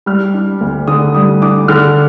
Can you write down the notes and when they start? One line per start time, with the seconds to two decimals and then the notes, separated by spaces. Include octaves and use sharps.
0.06 G3 F6
0.34 D4
0.61 D2
0.88 D3 D#6
1.14 G3 D#6
1.42 D4 D6
1.68 D3 F6